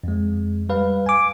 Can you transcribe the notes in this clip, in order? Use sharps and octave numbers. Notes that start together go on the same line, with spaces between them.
F2 G#3
G3 B4 F5
G#5 D6